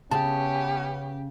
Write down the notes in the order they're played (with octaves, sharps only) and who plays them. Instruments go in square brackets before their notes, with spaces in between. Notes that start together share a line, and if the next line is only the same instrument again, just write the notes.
[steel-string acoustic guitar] C#3 [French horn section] B3 C#4 [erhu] G4 [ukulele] A5